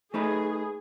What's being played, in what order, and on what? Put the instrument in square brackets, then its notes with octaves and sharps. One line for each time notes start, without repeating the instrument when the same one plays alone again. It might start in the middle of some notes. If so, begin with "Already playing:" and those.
[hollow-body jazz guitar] A3 D#4 B4 [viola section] G#4